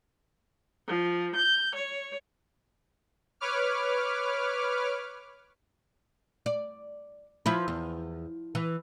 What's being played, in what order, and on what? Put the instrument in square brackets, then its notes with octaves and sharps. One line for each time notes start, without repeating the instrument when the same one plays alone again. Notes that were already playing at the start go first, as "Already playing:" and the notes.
[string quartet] F3
G6
C#5
[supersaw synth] B4 C#5 D6 F6
[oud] D5
F3 E4 B4
E2
E3